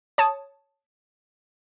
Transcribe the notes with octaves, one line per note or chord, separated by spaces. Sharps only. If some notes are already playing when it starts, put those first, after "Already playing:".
C#5 A5 D#6